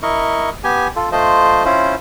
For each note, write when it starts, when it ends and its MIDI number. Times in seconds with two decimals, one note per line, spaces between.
0.03 0.50 64
0.03 0.50 70
0.03 0.50 75
0.03 0.50 85
0.64 0.88 59
0.64 0.88 67
0.64 0.88 80
0.96 1.10 65
0.96 1.10 69
1.12 1.65 57
1.12 1.65 65
1.12 1.65 72
1.12 1.65 75
1.65 1.95 61
1.65 1.95 64
1.65 1.95 65
1.65 1.95 72